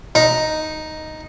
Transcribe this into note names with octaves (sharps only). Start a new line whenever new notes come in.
D#4